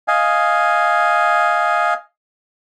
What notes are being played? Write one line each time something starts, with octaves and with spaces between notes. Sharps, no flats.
D#5 F5 G#5